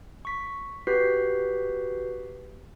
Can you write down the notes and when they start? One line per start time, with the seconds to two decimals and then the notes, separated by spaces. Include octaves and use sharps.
0.25 C#6 B6
0.87 F#4 G4 B4 G6 B6 C7